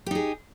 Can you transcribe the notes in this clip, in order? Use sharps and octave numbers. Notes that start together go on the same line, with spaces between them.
D#4 G4 G#4